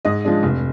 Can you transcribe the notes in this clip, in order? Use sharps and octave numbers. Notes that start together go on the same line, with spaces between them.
G#2 D#5
F3 G#3 D4
F1